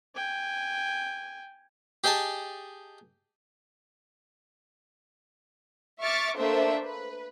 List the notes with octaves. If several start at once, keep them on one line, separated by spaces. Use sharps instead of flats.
G5 G#5
G4 G#4 D#5 G#5 A5
E5 C#6 D6 F6 A6
A3 A#3 D4 C5 E5
B4